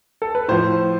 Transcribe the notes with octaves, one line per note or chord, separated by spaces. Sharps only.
A4
B4
A2 F3 C5